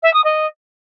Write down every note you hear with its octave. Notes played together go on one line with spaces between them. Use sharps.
E5
D#6
D#5